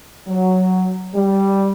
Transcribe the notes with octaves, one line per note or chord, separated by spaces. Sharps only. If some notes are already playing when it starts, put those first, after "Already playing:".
F#3
G3